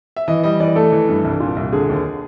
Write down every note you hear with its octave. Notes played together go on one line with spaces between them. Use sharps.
E5
E3 D#5
G3 D#5
E3 D5
A3 A4
E3
G2
C2
A#2
C2
D3 G#4
D#2